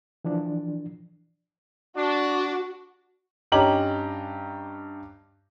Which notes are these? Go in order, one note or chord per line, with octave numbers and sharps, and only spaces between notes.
E3 F3 D4
D4 F#4
G2 C#4 D#4 G4 A#5 F#7